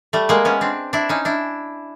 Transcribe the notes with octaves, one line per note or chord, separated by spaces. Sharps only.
G3 A3
G#3 A#3
B3 C#4
C4 D4
D4 E4
C#4 D#4
D4 E4